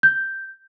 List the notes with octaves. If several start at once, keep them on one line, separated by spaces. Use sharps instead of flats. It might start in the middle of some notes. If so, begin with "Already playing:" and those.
G6